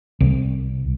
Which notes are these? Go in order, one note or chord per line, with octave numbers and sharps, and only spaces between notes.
C2